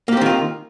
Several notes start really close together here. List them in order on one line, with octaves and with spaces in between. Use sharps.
A#3 G4 C4 D#3 F4